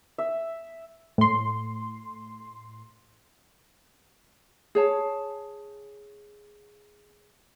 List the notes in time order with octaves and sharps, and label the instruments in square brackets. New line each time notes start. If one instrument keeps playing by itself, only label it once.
[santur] E5
[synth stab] A2 C6
[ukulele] G#4 C#5 A5